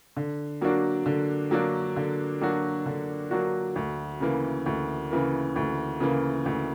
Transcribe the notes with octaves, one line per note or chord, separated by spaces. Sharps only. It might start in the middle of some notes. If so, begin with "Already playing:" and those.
D3
F#3 A#3 D4 F#4
D3
F#3 A#3 D4 F#4
D3
F#3 A#3 D4 F#4
D3
F#3 A#3 D4 F#4
D2
C#3 E3 A#3
D2
C#3 E3 A#3
D2
C#3 E3 A#3
D2